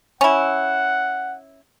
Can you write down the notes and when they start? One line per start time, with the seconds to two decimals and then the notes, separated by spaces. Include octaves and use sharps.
0.21 C#4 E4 F#5